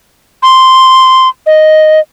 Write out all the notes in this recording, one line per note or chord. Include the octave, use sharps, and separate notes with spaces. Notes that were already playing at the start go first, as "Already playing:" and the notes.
C6
D#5